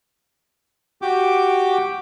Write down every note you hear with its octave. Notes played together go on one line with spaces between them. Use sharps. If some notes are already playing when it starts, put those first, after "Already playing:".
F#4 G4 G5 D6